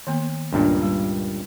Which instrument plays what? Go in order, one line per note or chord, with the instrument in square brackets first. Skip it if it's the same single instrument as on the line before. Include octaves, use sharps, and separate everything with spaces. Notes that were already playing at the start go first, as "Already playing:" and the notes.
[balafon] D#3 A#3 B3
[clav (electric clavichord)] C#2 G2 A#2 [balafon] B3 D4
[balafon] G3